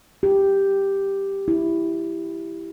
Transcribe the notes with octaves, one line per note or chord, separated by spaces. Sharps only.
G4
E4